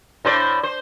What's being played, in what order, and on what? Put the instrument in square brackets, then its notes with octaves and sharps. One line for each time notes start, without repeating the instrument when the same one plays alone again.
[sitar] A2 C5 D5
C5